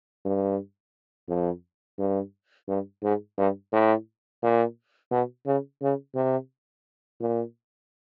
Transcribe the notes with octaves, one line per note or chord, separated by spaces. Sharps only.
G2
F2
G2
G2
G#2
G2
A2
A#2
B2
C#3
C#3
C3
A#2